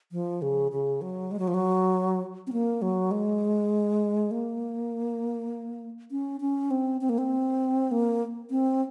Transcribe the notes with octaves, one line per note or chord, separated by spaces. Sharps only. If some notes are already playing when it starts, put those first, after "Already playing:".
F3
C#3
C#3
F#3
G#3
F#3
F3
F#3
C4
A#3
F#3
G#3
A#3
C#4
C#4
C4
C4
A#3
C4
A#3
C4